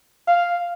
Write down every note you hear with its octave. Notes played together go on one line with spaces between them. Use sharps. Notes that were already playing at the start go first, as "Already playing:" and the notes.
F5